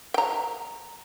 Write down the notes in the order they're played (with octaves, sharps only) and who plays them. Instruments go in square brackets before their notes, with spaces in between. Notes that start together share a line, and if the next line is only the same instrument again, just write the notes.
[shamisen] G5 A#5